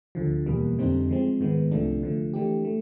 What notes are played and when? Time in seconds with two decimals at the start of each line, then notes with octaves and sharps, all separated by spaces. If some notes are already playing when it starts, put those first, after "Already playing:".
0.15 D2 D3 F3
0.46 E2 B2 G3 A#3
0.78 F2 D3 G3 C4 D#4
1.09 F3 G#3 C4
1.40 G#2 D#3 G#3 B3
1.71 C2 C3 F3 A3 D4
2.03 D3 F3 A3
2.34 E3 A3 D4 G4
2.65 A3